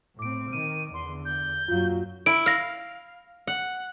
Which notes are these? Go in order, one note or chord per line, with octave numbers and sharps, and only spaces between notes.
A2 C4 D6 D7
D#3 D#7
E2 D3 C6
G6
F#2 A#2 F#3 F4 F5
E4 D7
F5 F6 A#6
F#5